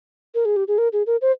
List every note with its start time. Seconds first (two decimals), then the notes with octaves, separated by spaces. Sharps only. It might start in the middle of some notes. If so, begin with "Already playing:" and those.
0.35 A#4
0.45 G#4
0.56 G4
0.68 G#4
0.78 A#4
0.93 G#4
1.06 A#4
1.21 C5